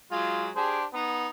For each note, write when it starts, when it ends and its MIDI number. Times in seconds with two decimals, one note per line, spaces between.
0.11 0.50 54
0.11 0.50 56
0.11 0.48 65
0.56 0.85 62
0.56 0.85 67
0.56 0.78 68
0.56 0.85 72
0.93 1.28 59
0.93 1.29 63